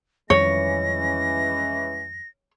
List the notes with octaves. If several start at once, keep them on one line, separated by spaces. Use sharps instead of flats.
F2 D#3 E3 G3 G#3 C#4 C#5 A#6